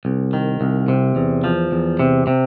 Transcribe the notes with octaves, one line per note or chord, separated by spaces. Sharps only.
C2
D#3
C2
C3
E2
F3
E2
C3
C3